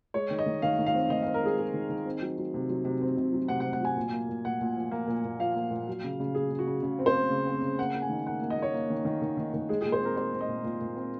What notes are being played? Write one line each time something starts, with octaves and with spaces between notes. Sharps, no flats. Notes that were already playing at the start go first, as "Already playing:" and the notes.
G#3 C#5
D#3
D#5
D#3
D#3 F5
D#3
F5
C4
D#3 D#5
F5
C4
A#4
G#3 G#4
G#3 G#4
D#3
D#3
C4
F#3
F#3
C3
F#3
C3
C4
C3
F#3
C3 F#5
F#5
C4
F#5
F#3 G#5
A#2
A#3
A#2
A#2 F#5
A#2
F3
A#3
A#2
A#2
F3 F5
A#3
A#2
F#3
C#3
C#3
C#3 G#4
C#3
F#4
C#3
C#3
C4
C5
C4
C#3
C4
C#3
A#3 F#5
A#3
G#5
D#3
A#3 F#5
A#3
D#5
A#3
C#5
A#3
D#3
D#3
D#3
D#3
D#3
G#3 G#4
G#4
A#2
C5
C4 A#4
C4 C5
C4
D#5
A#2
A#2
A#2
C4